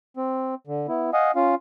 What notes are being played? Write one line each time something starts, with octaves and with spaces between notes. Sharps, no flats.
C4
D3
B3 E4
D#5 F5 F#5 G#5 D#6
C#4 F4 F5